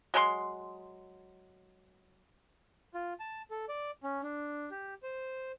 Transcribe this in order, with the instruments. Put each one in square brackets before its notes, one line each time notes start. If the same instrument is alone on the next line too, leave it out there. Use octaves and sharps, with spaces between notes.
[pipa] F#3 G#3 B4 C6
[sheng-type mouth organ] F4
A5
A4
D5
C#4
D4
G4
C5